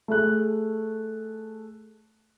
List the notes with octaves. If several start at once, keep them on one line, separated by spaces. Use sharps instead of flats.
A3 G#4 F#6